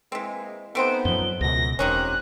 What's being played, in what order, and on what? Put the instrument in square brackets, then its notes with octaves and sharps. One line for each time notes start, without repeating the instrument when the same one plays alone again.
[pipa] E3 C4 [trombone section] G#3 A#3
[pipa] A3 C4 C5 [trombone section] B3 D#4 [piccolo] D7
[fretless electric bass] F#2 F3 [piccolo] G7
[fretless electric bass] C#2 B2 [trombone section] F#2 [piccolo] A#6
[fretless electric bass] E1 [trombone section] F2 G4 C5 [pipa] C3 D#3 C#4 [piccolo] F#6